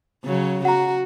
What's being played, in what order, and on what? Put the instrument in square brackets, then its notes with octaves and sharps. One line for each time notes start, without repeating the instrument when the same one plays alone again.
[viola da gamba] C#3 F#3
[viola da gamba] F#4 [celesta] F#5 A#5